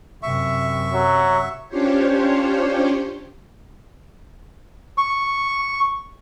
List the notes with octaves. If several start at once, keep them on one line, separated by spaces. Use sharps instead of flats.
F#2 C3 E5 C#6
F#3
C#4 D4 F4 G4 C5 C#5
C#6